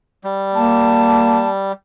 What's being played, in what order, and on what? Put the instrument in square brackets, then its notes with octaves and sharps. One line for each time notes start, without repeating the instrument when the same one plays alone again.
[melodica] G3
[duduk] A#3 [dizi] A5